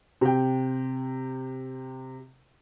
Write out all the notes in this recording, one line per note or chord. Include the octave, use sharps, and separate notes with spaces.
C3 G5